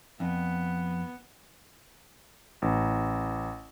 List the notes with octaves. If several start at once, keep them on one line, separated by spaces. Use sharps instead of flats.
F2 B3
A1